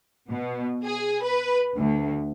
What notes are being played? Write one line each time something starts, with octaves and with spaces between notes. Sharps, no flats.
B2
G#4
B4
D2